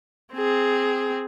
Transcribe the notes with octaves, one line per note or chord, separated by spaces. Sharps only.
C4 G#4